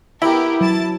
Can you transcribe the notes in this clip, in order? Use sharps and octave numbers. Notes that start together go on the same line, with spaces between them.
B3 E4 G4 A#4
F#3 A5 A6